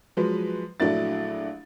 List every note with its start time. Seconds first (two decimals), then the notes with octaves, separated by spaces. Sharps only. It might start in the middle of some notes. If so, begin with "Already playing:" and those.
0.17 F3 F#3 G#3 B4
0.80 A#1 F#3 A3 D4 E4 A6